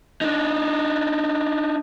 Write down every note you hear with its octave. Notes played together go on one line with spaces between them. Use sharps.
D4 D#4